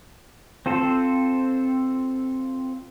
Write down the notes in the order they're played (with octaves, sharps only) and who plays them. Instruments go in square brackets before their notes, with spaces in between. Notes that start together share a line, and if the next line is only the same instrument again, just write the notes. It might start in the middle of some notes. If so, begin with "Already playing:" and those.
[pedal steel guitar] C4 F4 A4 C5